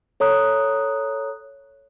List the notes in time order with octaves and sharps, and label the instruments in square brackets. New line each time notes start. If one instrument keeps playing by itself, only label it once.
[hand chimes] A4 C#5 A#5 D#6 F#6